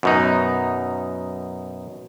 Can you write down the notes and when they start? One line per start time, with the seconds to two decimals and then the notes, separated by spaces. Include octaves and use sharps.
0.03 F#2 B2 D#4